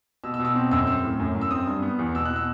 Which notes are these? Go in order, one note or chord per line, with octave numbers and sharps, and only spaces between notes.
B2 E6
E6
B2
E6
C4
F#2 E6
C4 E6
A2
F#2
F#2
E6
C4 D#6
G2
B3
E2
B2 E6
F#6
B2
E6